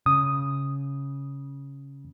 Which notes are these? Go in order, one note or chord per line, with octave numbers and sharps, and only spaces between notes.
C#3 D#6